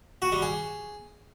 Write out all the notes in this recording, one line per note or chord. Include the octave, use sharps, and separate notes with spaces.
F#4
G3
G#4